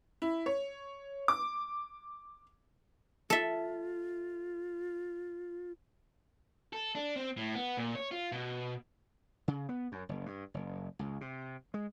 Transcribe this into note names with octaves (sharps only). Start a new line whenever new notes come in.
E4
C#5
D6
F4 A4 E5
A4
D4
C4
A2
B3
A#2
C#5
F4
B2
C#3
B3
F#2
F#1
G2
F#1
C#2
C3
G#3